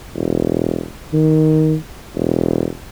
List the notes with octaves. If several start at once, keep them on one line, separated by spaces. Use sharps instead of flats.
E1
D#3
E1